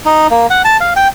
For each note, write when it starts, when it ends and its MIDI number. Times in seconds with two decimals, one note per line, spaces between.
0.06 0.27 63
0.31 0.47 58
0.50 0.62 78
0.64 0.77 81
0.81 0.93 77
0.96 1.08 79